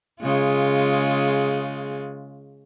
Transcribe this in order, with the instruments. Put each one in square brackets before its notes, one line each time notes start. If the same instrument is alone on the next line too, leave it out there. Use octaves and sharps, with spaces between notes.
[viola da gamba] C#3 G#3 F4